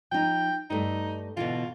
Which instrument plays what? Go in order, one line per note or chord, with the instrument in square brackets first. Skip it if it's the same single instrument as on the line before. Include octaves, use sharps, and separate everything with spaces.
[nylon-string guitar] F3 D#4 [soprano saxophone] G5
[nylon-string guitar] G2 A3 [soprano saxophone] D#4
[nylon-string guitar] B2 D3 E3 [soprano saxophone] F4